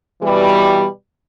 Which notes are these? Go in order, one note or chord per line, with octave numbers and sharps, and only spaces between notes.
B2 E3 G3